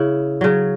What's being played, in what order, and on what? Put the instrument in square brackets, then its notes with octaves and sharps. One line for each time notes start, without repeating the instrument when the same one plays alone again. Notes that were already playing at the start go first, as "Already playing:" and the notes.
Already playing: [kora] C#3 E4
C#3 F#3